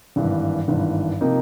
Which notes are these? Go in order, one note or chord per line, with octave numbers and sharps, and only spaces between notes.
G#1 G2 E3
G#1 G2 E3
C3 F3 A#3 D#4